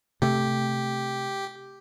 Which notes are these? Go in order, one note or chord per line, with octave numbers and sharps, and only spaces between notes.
C3 A3 G4